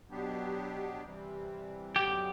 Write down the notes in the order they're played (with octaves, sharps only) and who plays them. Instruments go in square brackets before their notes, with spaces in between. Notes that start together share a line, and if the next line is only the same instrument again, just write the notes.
[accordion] B2 F#3 B3 D4 G4
C3 E3 G3 C4
[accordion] F#2 D3 F#3 B3 [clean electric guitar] G4